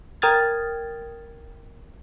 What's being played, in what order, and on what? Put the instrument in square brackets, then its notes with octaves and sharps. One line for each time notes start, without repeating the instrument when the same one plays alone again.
[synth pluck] A#4 G5 D#6 F6 G#6 A6